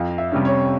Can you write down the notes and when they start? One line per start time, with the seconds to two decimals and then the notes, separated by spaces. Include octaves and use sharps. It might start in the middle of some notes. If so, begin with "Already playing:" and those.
Already playing: F2 F5
0.18 E5
0.32 C3 G3 C#4
0.45 C#5